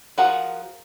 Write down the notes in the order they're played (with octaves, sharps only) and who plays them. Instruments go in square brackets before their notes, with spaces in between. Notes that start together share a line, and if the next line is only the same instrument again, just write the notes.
[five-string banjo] F3 F#4 G#4 A#4 F#5